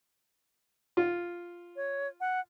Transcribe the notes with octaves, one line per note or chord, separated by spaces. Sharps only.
F4
C#5
F#5